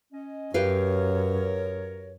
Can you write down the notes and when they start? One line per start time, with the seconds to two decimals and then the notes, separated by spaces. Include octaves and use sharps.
0.13 C#4 D#5
0.54 F#2 G4 A#4 B4 C#5 F5